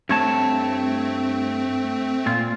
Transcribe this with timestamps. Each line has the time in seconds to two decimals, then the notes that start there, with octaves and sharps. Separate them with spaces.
0.09 G2 A3 C4 C#5 A5
2.26 A#2 F4